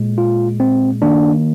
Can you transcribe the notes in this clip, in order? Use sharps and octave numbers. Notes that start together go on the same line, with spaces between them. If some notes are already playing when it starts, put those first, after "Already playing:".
Already playing: A#2 G#3
F4
C4
D#3 A#3 D4